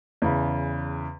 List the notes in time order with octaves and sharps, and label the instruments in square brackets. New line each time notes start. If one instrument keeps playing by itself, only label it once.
[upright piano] E2 C#3